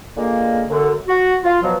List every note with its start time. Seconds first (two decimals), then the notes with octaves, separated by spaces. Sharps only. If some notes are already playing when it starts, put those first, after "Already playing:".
0.16 A#2 D3 G#3 A#3
0.69 F#2 D3
1.09 F#4
1.44 F4
1.62 B2 F3 F#3